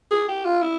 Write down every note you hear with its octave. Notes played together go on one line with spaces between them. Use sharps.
G#4
G4
F4
E4